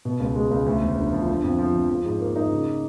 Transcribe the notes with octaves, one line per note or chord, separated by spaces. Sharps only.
B2
C#2
G#3
C#2
D2
E1
D3
F3
D3
F2
F3
F2
F3
G#2
A#3
D#4
C#3